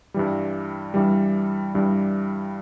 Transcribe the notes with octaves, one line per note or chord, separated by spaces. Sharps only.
G2 E3 G3
G2 E3 G3
G2 E3 G3